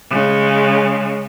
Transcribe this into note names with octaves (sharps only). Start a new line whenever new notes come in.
C#3 G#3